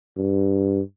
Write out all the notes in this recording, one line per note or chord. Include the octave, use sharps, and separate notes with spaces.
G2